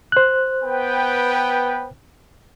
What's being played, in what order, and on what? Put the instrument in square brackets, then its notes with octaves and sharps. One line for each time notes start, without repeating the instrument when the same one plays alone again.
[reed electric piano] C5 F#6
[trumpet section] B3 B4 G5